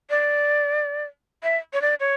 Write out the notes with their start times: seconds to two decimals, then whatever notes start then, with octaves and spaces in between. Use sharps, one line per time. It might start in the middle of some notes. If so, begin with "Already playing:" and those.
0.10 D5
1.43 E5
1.73 C#5
1.82 D5
2.00 C#5